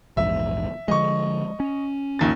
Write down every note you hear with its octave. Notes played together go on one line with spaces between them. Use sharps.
A#1 E2 G#2 E5
D3 F3 G#3 D#5 C#6
C#4
A#1 D#2 A6